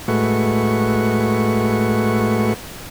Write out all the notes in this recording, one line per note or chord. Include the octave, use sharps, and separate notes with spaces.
A2 G#3 A3 F#4 B4 C#6